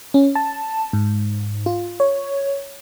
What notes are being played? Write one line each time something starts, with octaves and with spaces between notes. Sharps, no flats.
C#4
A5
G#2
F4
C#5